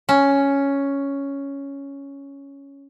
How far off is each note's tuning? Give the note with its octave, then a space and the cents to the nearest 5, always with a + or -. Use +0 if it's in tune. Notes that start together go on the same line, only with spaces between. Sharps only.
C#4 +5